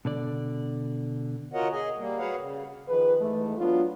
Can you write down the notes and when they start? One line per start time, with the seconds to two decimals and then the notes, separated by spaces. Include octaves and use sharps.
0.05 B2 D3 D5
1.54 F4 F#4 A#4 C#5 D#5 F#5
1.72 G#4 D#5 G#5
1.97 G3 A#3
2.19 F#4 G#4 B4 C#5 F5 F#5
2.38 C#3
2.88 D#3 F3 G#4 B4
3.20 G#2 E3 A3
3.58 F#3 B3 D4 F4